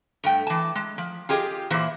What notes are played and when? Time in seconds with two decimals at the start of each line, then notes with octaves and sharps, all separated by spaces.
0.24 G2 A3 G5
0.47 E3 A5
0.75 G#3
0.98 F3
1.29 F4 G4 G#4 D#5
1.70 A#2 E3 E4 C5